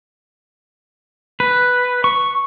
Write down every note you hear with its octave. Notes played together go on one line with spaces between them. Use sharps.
B4
C#6